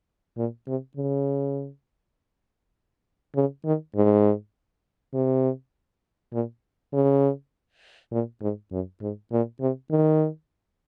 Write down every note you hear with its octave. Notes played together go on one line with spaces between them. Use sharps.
A#2
C3
C#3
C#3
D#3
G#2
C3
A#2
C#3
A#2
G#2
F#2
G#2
A#2
C3
D#3